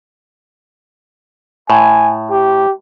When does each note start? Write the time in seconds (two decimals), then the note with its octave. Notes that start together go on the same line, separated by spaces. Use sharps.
1.70 A2 G#5
2.31 G4